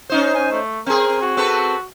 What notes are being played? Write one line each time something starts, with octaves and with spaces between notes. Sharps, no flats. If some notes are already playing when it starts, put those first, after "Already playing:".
C#4 D#4 C5
G#5
A3
C4 G#4 A#4
F#4
C4 A4 B4